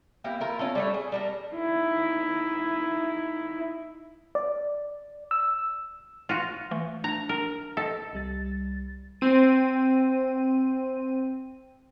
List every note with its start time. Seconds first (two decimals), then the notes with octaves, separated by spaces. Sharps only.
0.24 A#3 E4 G4
0.40 E4 F4 A#4
0.59 C#4 F4 A4
0.75 G3 A3 C#5
0.94 G#4
1.12 G3 A4 A#4
1.52 D#4 E4
4.35 D5
5.31 E6
6.29 F4 F#4 F5 A#6 D#7
6.71 E3 A3
7.04 D4 A#5
7.29 A#4
7.77 A4 D#5
8.13 C2 G3 A6
9.21 C4 D#7